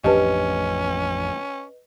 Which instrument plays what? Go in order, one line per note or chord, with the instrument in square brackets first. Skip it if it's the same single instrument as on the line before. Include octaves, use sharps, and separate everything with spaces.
[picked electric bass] A1 F2 D4 [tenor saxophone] C#4 [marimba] G4 A5 [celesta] B4 D#5